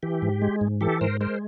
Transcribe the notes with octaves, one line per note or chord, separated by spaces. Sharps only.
E3 G4
G#2
G#3
G#2
E3 G4 A4
G#2 A#4 C5
G#3 A#4 C5